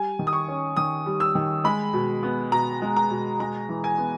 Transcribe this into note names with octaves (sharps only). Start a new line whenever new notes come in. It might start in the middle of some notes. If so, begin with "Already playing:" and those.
Already playing: G3 G#5
D#3
D#6
C#6
C#4
D#3 D#6
G3
E6
D#3
G#3 B5
B2
B3
B2 A#5
G#3
A#5
B2
G#3 A#5
E3
G#5
B3